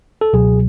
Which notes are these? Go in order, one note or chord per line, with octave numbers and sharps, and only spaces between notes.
A4
C#2 B2 F#3 G#4